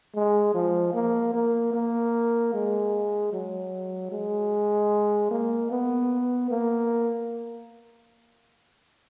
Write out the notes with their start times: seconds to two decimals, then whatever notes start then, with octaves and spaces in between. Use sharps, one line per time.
0.15 G#3
0.54 F3
0.94 A#3
1.34 A#3
1.73 A#3
2.54 G#3
3.33 F#3
4.12 G#3
5.31 A#3
5.71 B3
6.50 A#3